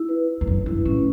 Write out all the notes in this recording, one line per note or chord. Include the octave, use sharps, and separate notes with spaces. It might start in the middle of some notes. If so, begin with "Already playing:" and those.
Already playing: E4
B4
B4
E2
F#2 B4
G2 E4
A2 C#4